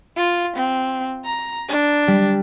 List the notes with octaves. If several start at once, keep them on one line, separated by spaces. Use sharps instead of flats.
F4
C4
A#5
D4
G3